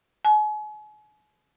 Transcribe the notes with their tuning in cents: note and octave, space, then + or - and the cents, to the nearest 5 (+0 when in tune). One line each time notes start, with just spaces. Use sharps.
G#5 +40